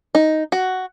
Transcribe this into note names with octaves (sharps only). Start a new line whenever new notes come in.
D#4
F#4